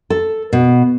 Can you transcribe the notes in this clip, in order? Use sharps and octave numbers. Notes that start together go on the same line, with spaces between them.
A4
B2